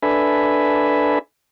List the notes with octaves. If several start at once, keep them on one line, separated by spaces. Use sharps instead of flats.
D4 A4 B4 E5 G#5 B5